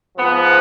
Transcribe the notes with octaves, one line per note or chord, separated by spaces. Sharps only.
G#2 F3 B3